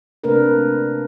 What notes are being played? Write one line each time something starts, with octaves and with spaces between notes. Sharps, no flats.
C3 A3 A#3 D4 A#4 B4